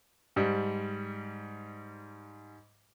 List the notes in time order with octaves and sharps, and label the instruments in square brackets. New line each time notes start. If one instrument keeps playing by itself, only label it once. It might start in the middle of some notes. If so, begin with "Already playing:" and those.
[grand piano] G#2 G3